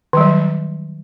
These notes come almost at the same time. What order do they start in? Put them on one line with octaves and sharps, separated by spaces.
D#3 G3 F#3